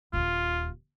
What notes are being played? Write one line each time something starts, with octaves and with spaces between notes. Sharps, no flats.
D#1 D#2 F4